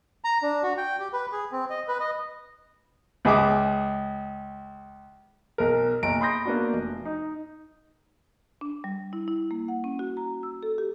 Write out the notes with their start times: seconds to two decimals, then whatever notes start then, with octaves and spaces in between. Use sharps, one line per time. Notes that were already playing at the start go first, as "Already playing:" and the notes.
0.24 A#5
0.42 D4
0.63 F#4
0.77 G5
1.00 G4
1.13 B4
1.32 G#4
1.52 C4
1.70 D#5
1.88 B4
2.00 D#5
3.25 C#2 G#4 E5 D6
5.58 B1 A#4
6.03 F#1 B1 A#5 D7
6.21 B5 C6 D#6 G6 A#6
6.45 A#3 B3 D4 F#4
6.73 F1
7.05 D#4
8.61 D4
8.84 G3
9.13 E4
9.28 E4
9.51 A#3
9.68 F#5
9.84 C#4
9.99 F#4
10.17 A#5
10.43 E6
10.63 A4
10.78 G4